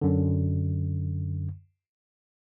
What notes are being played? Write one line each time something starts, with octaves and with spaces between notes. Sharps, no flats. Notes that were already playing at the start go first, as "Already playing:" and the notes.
F#2 D3